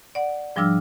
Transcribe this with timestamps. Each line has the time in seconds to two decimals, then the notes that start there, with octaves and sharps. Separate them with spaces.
0.15 D5 F#5
0.56 G#2 F3 G3 D4 E6 F6